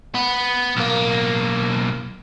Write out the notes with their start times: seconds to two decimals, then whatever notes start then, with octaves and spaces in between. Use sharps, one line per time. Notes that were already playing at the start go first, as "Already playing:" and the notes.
0.15 B3
0.77 B1 A#3